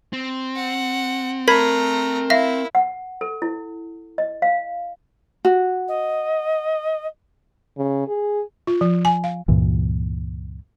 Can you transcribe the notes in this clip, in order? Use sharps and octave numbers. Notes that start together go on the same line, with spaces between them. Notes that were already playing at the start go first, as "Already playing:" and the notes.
C4
F#5
A3 A#4 A#5 B5 G#6 B6
E4 E5 F5 A#6
F#5
A4
E4
D#5
F5
F#4
D#5
C#3
G#4
F4
F3
G#5
F5
C#2 G2 A#2 E3